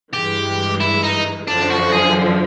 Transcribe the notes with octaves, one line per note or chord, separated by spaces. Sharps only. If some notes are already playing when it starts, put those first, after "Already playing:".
G2 E3 G#3 G4
E4
D#4
F#2 D3 F3 D4
F#4
G#4